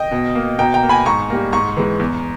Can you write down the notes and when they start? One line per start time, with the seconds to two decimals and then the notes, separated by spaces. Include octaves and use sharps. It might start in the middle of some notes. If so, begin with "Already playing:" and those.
Already playing: D#5 G5
0.11 B2
0.35 A#3
0.59 B2 G5 A#5
0.74 G5 A#5
0.83 A#3
0.89 G#5 B5
1.05 G#2 A#5 C#6
1.30 G3 A#3
1.52 G#2 A#5 C#6
1.77 E3 G#3
2.00 E2